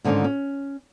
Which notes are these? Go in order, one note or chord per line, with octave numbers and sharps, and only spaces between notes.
G#2 D3 D#3 C#4 F4
C#4